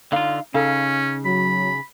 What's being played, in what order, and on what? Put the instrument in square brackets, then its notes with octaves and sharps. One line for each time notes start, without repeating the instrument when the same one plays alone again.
[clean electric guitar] D3 F4 [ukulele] D#4 F5
[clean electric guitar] C#3 [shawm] C#4 [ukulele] D#4 A4 F5
[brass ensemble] F#3 [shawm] B5